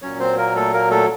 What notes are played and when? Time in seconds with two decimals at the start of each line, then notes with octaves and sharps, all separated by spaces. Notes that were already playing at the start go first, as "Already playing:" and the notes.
0.02 A#2 F#3 C#4 C#5
0.20 C4 C5
0.37 A#3 A#4
0.56 A3 A4
0.73 A#3 A#4
0.90 A3 A4